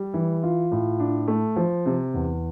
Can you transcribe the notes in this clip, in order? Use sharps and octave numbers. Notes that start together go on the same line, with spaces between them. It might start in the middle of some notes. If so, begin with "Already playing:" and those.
Already playing: G3
E3
F4
A2
D4
A3
F3
C3
E2